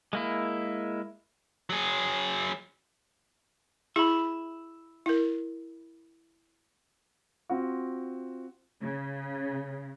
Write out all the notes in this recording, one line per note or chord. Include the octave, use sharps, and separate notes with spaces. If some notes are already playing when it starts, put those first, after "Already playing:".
G#3 A#3 E4
F#3 G#4
E4 G#4 E5 B5
E4 A#4
C4 F4 F#4
C#3